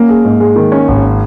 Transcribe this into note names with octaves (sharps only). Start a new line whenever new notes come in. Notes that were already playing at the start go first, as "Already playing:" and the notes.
Already playing: A#3 C#4
G#4
G#2
G#3
D#3
C#4
G#1